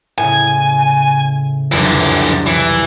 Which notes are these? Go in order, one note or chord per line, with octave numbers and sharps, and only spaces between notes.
A2 C#3 G#5
F#1 C2 F2 D3 E3
E3